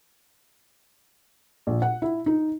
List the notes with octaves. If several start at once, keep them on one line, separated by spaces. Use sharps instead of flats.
A#1
F#5
E4
D#4